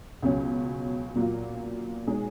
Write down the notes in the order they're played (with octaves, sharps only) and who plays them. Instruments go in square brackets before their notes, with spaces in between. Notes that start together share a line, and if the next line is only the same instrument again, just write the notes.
[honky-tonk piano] C#2 B2 F#3 C#4
A#2 F#3 A#3 F4
B2 G#3 D#4 G#4 C#5